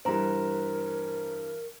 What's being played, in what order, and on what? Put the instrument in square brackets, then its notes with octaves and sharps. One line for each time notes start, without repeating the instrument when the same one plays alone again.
[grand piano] G2 E3 G3 [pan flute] A#4 [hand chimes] C5 A#5